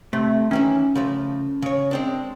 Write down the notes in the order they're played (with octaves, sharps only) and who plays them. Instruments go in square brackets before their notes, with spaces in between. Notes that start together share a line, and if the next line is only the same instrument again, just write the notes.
[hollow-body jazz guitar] C3 [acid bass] A3
[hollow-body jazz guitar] D#3 E3 E4 [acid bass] C#4
[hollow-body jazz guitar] C#3 F3 A3
C#3 C#5
G#3 C4 D4